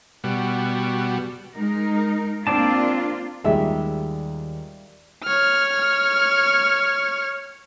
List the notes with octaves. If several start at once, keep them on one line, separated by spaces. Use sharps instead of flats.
B2 G3 F#4
G#3 D#4 A#4
A#3 C4 D4 F4 D5 A5
D#2 A#2 D#3 G3 G#3 E5
C#5 F6